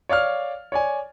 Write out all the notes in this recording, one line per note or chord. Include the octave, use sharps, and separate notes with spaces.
C#5 D5 F5 F6
C#5 D5 G#5